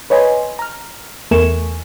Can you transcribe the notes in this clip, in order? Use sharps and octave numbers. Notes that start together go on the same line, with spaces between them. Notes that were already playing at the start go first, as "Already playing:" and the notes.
B4 C#5 D#5 G#5 B5 C6
A#5 F6
E2 A3 A#4 G#5 C#6 E7